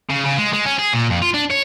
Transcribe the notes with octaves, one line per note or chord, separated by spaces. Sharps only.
C#3
C#3
G#3
G#3
C#4
G#4
A#2
F2
F4
D4
C#5